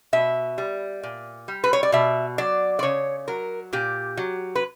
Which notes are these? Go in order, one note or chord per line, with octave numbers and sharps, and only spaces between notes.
B2 E5
G3
A#2
G3
B4
C#5
D5
B2 E5
F#3 D5
D5
C#3 C#5
F#3 A#4
A#2 G4
F#3
B4